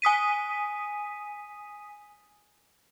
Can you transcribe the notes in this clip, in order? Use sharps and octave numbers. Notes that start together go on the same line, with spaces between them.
G#5 D#6 B6 D#7